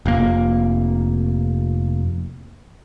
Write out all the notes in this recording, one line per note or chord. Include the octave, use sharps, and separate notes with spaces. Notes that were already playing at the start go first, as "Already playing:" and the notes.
F1 A#3